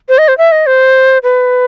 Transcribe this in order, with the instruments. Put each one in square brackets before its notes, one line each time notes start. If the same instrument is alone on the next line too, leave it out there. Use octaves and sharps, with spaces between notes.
[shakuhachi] C5
D#5
C5
E5
D#5
C5
B4